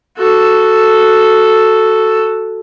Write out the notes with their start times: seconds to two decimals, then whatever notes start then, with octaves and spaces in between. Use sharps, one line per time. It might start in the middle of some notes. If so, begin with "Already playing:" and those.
0.17 F#4 A4